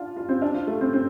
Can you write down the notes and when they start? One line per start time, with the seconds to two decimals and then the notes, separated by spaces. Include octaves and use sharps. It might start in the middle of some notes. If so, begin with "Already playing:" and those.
Already playing: D4 F4
0.17 F4
0.29 C4
0.42 D4
0.54 F4
0.67 A3
0.81 C4
0.93 C4